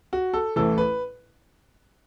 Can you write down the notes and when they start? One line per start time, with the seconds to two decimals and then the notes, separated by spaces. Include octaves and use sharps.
0.13 F#4
0.34 A4
0.56 A1 A2 E3 A4
0.78 B4